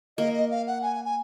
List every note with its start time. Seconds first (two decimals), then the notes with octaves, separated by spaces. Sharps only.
0.18 A#3 D#5
0.34 D#5
0.51 F5
0.67 F#5
0.82 G#5
1.05 G#5